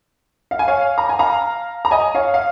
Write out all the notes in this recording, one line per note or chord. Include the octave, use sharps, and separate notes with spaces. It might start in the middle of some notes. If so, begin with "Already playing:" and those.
F5
G#5
C#5 F5
A#5
G#5
F5 A#5
A#5
D#5 G#5
C#5 F5
F5